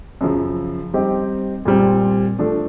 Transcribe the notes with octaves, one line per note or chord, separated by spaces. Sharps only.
F#2 C#3 F3
G3 C4 D#4 G4
A#2 G3 C4
F3 A3 D4